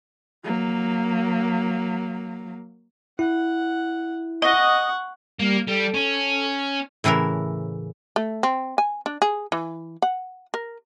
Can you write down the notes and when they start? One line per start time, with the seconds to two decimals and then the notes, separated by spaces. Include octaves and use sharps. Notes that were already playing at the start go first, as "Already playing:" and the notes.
0.45 F#3 A#3
3.19 E4 F#5
4.42 D#5 F#5 C#6
5.39 G3 A#3
5.67 G3 A4
5.94 C#4
7.04 A2 C#3 E3 E4 A#4
8.16 A3
8.43 C4
8.78 G#5
9.06 D4
9.22 G#4
9.52 E3
10.02 F#5
10.54 A#4